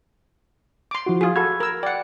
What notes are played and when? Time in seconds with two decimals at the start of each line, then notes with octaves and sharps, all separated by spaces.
0.91 C6 D6
1.06 F3 E4 F#4
1.21 F4 G#4
1.36 F#4 A4 B5 G#6
1.60 A#4 E6
1.83 D5 F#5 G5